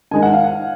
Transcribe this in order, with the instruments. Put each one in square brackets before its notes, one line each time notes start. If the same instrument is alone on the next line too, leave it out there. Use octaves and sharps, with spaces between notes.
[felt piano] D#3 G#3 D#4 [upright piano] G#5
[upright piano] F#5
F5
F#5